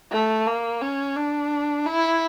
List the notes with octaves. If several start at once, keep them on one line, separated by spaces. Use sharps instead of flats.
A3
A#3
C#4
D4
E4